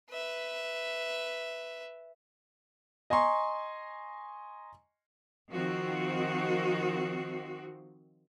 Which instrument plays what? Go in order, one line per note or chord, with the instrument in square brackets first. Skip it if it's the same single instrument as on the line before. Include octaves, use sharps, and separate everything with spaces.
[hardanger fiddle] B4 E5
[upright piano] D#5 G#5 A#5 C6 C#6
[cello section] D#3 F3 C4 F#4